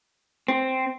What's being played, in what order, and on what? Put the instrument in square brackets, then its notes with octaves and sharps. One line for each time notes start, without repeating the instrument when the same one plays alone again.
[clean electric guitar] C4